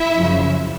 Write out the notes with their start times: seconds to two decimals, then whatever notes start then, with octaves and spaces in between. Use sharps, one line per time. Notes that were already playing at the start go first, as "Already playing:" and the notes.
Already playing: E4 E5
0.15 F#2 C#3 F3